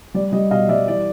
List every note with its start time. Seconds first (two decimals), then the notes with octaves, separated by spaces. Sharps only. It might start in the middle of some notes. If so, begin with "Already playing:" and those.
0.14 G3 D5
0.32 G3 D#5
0.51 B2 D#5 F5
0.69 G3 D5 E5
0.88 E3 D5